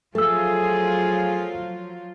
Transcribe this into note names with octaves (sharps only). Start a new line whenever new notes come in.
F3 F#3 A3 F4 G#4 A4 E6